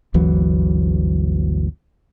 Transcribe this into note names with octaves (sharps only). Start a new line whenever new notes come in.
G1 D2 E3 F#3